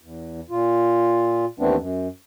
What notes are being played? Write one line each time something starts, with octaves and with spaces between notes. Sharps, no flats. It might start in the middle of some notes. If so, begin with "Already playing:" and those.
E2
A#2 F4
D#2 E3 A3 B3 C4 D4
F#2